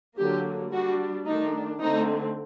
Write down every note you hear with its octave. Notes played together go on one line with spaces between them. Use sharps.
D3 F#3 A#3 G4
G3 D4 F#4
D#3 A3 D4 D#4
D3 A3 C4 D#4